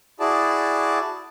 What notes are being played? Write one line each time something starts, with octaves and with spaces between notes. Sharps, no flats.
E4 F#4 G#4 D5 A5